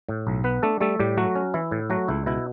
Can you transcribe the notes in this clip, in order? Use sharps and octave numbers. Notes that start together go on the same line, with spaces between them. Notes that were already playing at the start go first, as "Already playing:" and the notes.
A2
B1
B3 B4
A3 D4 A4
G3 A3 A4
A2 G3 G4
F#3 A3 F#4
C#4
E3 E4
A2
F#3 A3 F#4
C#2 E4
B2 E4